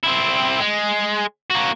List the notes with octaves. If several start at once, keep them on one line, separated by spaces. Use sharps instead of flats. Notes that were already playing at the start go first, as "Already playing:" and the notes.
C4 E4
G#3
A#3 F#4